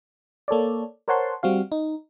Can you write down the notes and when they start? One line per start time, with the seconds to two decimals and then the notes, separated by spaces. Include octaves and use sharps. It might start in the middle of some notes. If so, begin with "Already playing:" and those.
0.48 A#3 A4 C#5 D5
1.08 A#4 C5 C#5 F#5 A5 C6
1.43 G3 C4 F#4 F5
1.72 D#4